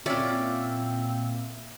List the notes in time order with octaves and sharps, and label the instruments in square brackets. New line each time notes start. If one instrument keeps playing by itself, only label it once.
[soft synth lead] A#2 [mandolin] A#3 E5 [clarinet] C4 [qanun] C#4 D5